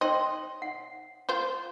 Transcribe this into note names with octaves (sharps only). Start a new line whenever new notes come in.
C5 D#5 G5 C6
F#5
F4 C5